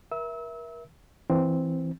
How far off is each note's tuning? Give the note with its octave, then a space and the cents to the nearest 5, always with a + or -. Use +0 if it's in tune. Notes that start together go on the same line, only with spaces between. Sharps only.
A#4 +30 E5 +0 E6 -30
E3 +0 C4 +0